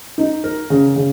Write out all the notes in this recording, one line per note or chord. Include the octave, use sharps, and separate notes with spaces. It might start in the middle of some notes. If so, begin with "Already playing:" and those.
D#4
A#4
C#3
C#3